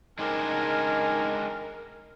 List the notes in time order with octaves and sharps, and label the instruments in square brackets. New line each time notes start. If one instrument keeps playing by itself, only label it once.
[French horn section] C#3 F#3 D#4 [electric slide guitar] G#3 C4 D4 [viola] A#4 [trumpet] G#5